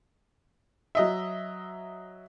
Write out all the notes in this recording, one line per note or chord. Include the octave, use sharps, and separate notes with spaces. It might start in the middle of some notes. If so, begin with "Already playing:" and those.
F#3 D#5 E5